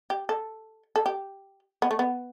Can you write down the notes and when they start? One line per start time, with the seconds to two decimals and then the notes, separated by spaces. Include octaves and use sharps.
0.10 G4
0.29 A4
0.96 A4
1.06 G4
1.82 B3
1.91 A3
1.99 B3